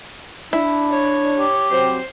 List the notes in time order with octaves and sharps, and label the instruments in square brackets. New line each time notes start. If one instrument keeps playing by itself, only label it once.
[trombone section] D4 [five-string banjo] E4
[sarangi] C#5
[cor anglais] G4
[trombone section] F#3 C4 [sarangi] C5